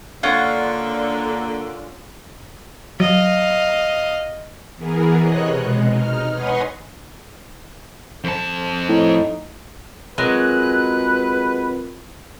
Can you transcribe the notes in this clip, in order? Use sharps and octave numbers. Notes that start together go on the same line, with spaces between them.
D3 A#3 C#4 F4 F#5
F#3 D#5 F5
E3 B3 G#4 A#4
C3 C#5 D#5 F#6
B2 G#3
D#4 F6
B4 C#5 D#5 F#5 G#5 C6
F2 A5
A2 D#4
F#3 G#3 C4 F4 A#4 B4 F#6